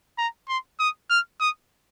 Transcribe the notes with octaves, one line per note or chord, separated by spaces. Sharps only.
A#5
C6
D#6
F6
D#6